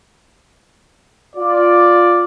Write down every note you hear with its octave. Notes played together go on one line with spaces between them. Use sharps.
F4 D5